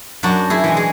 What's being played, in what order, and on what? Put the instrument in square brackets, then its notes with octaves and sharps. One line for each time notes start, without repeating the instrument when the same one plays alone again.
[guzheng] F#2 D4 F#4
E4 G#4
E3 G#3
G#4